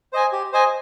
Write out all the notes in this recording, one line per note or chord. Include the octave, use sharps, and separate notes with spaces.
C5 D#5 G#5
G4
C5 D#5 G#5